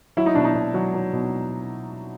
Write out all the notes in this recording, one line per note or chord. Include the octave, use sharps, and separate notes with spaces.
F#3 E4
D#4
B2 D4
D#4
B2
F#3
F#3
B2